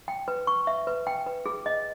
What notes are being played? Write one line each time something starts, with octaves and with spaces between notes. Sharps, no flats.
G5
B4
C#6
E5
B4
G5
B4
G#4
D#5